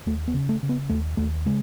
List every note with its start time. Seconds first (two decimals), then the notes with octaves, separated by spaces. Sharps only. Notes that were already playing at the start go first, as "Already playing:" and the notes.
0.06 D#2 A3
0.28 B3
0.34 C#3
0.49 A3
0.63 C#3
0.69 B3
0.89 D#2 A3
1.17 D#2 A3
1.46 C#3 G#3